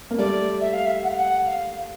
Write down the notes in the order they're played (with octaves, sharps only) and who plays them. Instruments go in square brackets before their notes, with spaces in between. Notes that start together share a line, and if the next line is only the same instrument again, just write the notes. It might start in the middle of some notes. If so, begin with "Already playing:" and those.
[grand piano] A#3
[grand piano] G3 A3 [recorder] D5
[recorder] E5
F5
E5
F#5
F5
F#5
F5